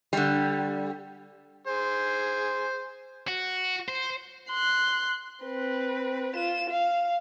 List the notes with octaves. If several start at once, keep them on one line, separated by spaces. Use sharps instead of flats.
D3 G3
G#4 C5
F#4
C5
C6 F#6
C4 B4
F4 E7
F5